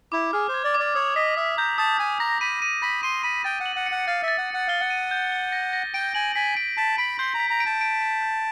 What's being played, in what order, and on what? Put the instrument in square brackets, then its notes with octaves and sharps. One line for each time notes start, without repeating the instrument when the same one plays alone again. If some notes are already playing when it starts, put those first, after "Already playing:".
[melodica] E4 [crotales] D6
[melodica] G#4 [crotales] F6
[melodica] C5
[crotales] G#6
[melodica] D5
[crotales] D6
[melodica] D5
[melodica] C#5 [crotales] D#6
[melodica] D#5 [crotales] B6
[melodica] E5 [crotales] D#6
[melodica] A#5 [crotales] G6
[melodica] A5 [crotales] D#6
[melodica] G#5 [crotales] G6
[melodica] A#5 [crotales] A#6
[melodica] B5 [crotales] D#7
[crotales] D#7
[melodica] B5 [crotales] A#6
[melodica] C6 [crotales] D#7
[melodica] B5 [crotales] D#7
[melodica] G5 [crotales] A6
[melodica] F#5
[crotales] F#7
[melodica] F#5
[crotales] C#7
[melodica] F#5
[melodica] F5 [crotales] A6
[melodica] E5 [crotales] A6
[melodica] F#5
[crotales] C#7
[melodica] F#5
[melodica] F5 [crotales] G7
[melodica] F#5
[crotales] D#7
G6
G7
A#6
A#6
[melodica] G5 [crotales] D7
[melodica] G#5 [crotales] F#7
[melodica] G#5 [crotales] B6
[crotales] D7
[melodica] A5 [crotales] B6
[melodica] B5 [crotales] D7
[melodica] C6 [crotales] G6
[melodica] A#5
[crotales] B6
[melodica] A#5
[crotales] D7
[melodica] A5
[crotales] D7
D7
G6